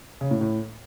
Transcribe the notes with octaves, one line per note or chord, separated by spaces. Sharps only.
C#3
A2
A2